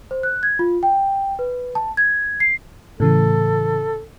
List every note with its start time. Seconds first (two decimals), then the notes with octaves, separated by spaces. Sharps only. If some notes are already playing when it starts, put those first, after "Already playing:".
0.11 C5
0.23 F#6
0.43 G#6
0.59 F4
0.83 G5
1.39 B4
1.75 A5
1.97 G#6
2.40 C7
3.00 A2 C#3 E3 A4